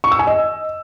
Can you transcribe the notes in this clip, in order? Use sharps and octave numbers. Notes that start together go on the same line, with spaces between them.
C#6
E6
G#5
D#5